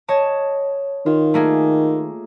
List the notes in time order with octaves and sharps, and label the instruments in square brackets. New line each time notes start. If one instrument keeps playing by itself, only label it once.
[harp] C#5 D#5 A5
[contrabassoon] D#3 [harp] F4
[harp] A3 A#3 G#4